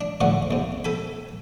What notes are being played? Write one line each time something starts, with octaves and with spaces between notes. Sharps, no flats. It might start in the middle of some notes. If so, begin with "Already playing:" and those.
D4
D2 A2 D3 F3 D5 F#5
D#2 C3
A4 G5 G#5 B5